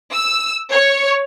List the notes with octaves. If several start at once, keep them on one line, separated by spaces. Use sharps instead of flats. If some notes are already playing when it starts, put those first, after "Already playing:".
E6
C#5